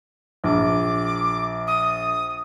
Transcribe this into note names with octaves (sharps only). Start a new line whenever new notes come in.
A#1 D6
D#6